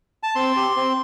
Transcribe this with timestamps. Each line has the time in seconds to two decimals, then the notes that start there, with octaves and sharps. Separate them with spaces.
0.23 A5
0.35 C4 C6
0.56 G4
0.76 C4